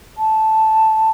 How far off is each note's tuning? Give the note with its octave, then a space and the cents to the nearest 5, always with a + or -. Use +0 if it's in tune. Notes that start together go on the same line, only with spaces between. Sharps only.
A5 -5